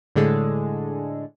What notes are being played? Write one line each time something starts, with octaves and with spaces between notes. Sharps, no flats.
A2 D3 G#3 G#4 A4